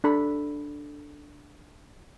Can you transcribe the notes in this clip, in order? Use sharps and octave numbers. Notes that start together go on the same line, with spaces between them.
D4 A4 B5